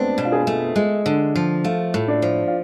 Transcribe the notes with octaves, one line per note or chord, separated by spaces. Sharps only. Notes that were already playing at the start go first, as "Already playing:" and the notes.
Already playing: G#3 A3 B3 C4 D4
B2
F4
G#4
A3
G#3
D3
F3
A3 F4
A2
D4
F3
F4